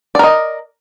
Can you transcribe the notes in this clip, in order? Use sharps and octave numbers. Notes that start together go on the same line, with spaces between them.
A#4 D5 D#5